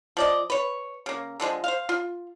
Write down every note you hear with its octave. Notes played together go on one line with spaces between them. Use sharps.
F3 D5 D#5
B4 C#5
C#3 A#3
D3 F3 F#3 G#3
C5 F5
F4